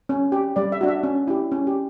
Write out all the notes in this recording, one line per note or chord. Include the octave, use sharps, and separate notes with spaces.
C#4
G4
G3 D5
E5
D4 F#4
E5
C#4
E4 G4
C#4
G4